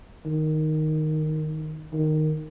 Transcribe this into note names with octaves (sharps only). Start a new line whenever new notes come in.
D#3
D#3